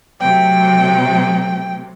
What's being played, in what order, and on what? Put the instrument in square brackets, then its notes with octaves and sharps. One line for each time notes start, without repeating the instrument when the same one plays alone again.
[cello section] C3 F#3 A3 [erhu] G5